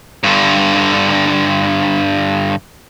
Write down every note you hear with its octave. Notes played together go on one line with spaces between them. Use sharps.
G2 D3